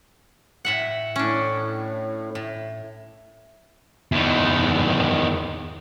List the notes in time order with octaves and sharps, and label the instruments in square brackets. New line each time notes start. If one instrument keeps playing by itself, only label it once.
[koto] A2 E5 F#5
[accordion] A2 [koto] C#4 D4
[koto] A2
[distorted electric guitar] E2 D#3